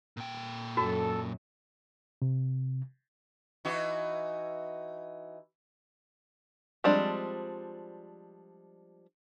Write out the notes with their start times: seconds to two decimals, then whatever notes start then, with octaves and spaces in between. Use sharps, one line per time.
0.17 A#2 G5
0.77 F#2 F#4 A4
2.22 C3
3.65 E3 D#4 F#4
6.84 F3 G3 G#3 C4 D4